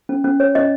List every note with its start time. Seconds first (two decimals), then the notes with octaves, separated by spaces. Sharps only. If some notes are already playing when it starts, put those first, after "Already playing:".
0.09 C#4
0.24 C#4
0.40 C#5
0.55 C#4 D#5